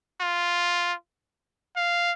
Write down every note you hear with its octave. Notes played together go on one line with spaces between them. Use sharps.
F4
F5